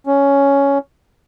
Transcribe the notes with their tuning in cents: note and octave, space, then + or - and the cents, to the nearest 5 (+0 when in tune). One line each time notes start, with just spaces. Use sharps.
C#4 +10